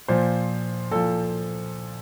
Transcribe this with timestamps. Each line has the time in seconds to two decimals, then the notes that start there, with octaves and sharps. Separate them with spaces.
0.08 A#2 F3 C5
0.91 A#2 F3 A4